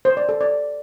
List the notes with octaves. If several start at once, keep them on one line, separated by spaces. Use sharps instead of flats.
C5
D5
A4
D5